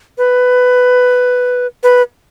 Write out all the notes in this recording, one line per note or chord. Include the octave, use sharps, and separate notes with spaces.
B4
B4